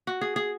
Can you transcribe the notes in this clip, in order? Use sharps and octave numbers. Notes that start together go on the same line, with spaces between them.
F#4
G#4
G#4